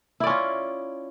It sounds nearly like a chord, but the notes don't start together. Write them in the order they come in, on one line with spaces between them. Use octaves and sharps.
E4 D5 C#4 F4